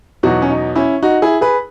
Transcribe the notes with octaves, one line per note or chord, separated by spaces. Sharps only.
E2 B2 F#3 D#4 F#4
C#4
D#4
C#4 E4
D#4 F#4
E4 G#4
G#4 B4